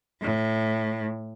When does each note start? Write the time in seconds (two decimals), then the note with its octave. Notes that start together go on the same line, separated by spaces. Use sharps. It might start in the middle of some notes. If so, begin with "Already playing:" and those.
0.22 A2